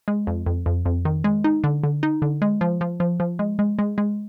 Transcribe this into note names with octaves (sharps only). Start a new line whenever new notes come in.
G#3
F2
F2
F2
F2
D#3
G#3
D#4
D3
D3
D#4
D3
G#3
F3
F3
F3
F3
G#3
G#3
G#3
G#3